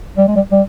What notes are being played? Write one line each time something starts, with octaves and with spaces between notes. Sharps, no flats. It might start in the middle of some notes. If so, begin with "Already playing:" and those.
G3
G#3
G3
G3